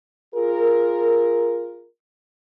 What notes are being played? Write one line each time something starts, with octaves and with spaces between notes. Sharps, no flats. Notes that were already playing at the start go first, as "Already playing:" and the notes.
F4 G#4 A#4